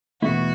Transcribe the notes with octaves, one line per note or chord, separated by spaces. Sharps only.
E2 B2 A3 E4 F#4